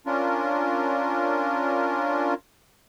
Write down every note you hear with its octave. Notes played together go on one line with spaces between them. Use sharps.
C#4 D4 F4 A#4